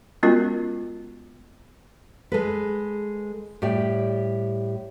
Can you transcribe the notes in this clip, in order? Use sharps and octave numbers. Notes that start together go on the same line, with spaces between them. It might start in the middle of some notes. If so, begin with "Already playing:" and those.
G#3 B3 C#4 F4 F#4 A#4
G#3 A4 B4
A2 G3 G4 D5 G5